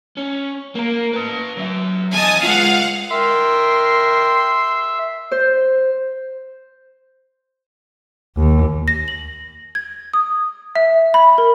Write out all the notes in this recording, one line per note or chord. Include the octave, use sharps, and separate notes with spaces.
C#4
A#3 A#4
B4 A5
F#3 E5
E2 D#5 G#5 A5 D#6
G#3 F4 F5 F#5
A#4 E5 G5 C6
C5
D#2
A#6
F#7
G#6
D#6
E5
B5
A#4